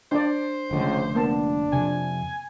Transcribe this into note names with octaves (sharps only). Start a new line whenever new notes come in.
D4 C5 D5
F1 C#2 D3 A3
A#3 B3 D4 A5
F2 C3 G#5